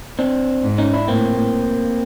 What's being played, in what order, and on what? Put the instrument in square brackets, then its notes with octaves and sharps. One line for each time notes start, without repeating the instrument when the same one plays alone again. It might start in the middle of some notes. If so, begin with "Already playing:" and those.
[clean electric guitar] C4 D4
[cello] G#2
[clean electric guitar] C#4 D#4
D4 E4
[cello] A2 [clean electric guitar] A#3 C4